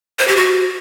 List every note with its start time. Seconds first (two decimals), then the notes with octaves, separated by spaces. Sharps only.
0.19 C5
0.28 G4
0.36 F#4